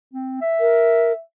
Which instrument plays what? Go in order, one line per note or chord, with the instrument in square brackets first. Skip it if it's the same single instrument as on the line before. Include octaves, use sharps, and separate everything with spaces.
[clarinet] C4
E5
[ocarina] A#4